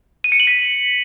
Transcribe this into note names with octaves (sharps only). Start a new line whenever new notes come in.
D#7
C#7
F#7
B6